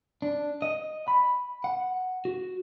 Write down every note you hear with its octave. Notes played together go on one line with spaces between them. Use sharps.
D4
D#5
B5
F#5
F#4